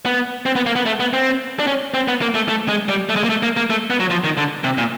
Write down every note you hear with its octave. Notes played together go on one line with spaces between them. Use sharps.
B3
C4
B3
A#3
B3
A3
B3
C4
D4
C#4
C4
B3
A#3
A3
A3
G#3
G3
A3
G#3
A#3
A3
A#3
A#3
A3
B3
F#3
F3
D#3
D3
C3
A#2